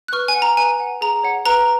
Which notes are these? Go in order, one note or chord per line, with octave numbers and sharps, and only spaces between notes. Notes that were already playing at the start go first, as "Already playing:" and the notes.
F#6
B4 C#6 F6
G#5
F#5
A#5
B4 G#5
F#5
G#4 A#5
C#5 F#5
B4 A#5